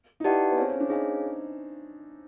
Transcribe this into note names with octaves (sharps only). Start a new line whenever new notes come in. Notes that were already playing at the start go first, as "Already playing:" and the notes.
D#4
E4 G4 B4 D5 F#5 A5
B3
C4 G#4 C#5 F5 G#5
C#4
D4
D#4 G#4 C#5 F5 G#5